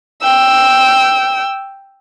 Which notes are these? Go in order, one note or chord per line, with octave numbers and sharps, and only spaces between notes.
G5 E6